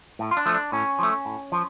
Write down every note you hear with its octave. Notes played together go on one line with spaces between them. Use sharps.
A2
F4
D4
F3 A3
D4
A2 C#4
F3 A3
A2
F3